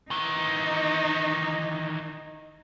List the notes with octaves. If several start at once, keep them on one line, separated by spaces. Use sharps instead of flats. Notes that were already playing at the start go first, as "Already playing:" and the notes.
D#3 E3 D#4